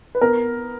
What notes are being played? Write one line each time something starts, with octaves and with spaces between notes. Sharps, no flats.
B4
B3 A#4